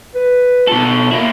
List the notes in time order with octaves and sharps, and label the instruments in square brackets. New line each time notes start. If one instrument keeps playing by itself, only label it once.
[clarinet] B4
[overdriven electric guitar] B2 A4 [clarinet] F4
[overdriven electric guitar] A#3 E4